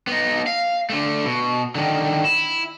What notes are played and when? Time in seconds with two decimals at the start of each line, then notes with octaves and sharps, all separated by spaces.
0.07 B3 D#4
0.47 F5
0.90 D3 A3
1.25 B2
1.75 D3 D#3
2.25 E4